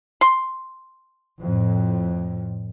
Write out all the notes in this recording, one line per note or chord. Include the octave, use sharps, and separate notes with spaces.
C6
F2 A2